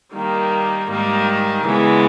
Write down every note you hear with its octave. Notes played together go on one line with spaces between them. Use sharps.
D#3 G3 A#3
G#2 D#3 G3 A#3
C#3 E3 G#3 B3